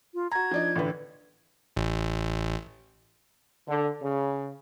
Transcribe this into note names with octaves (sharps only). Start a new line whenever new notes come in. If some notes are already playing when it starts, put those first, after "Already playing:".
F4
F#4 A#5 G#6
F3 D4 D#4
A1 D3 B4
A1
D3
C#3